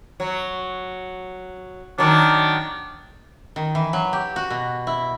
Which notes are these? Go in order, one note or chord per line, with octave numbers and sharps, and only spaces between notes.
F#3
D#3 F#3 D4
D#3
E3
F#3
G4
F#4
B2
E4